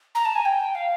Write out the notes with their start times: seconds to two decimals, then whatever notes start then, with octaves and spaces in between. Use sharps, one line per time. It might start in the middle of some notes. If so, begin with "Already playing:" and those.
0.15 A#5
0.25 A5
0.35 G#5
0.45 G5
0.75 F5